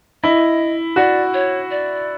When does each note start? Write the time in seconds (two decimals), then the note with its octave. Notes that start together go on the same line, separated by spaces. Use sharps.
0.23 E4 D#5
0.96 F#4 D5
1.34 C#5
1.71 D5